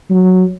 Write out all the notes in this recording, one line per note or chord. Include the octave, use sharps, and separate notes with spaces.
F#3